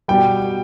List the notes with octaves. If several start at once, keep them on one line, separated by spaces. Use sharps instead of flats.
B2 G3 G5